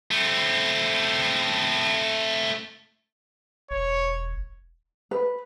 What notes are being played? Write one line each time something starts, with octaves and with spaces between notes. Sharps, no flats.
A3 C4
E1 C#5
B4